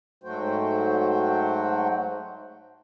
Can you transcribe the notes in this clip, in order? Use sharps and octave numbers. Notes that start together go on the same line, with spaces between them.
G#2 F#3 A3 F#4 C5 G5